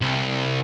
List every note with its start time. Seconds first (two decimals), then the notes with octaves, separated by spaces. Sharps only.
0.01 C2